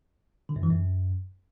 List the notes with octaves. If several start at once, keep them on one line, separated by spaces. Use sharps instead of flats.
D3
F#2
E3
F#2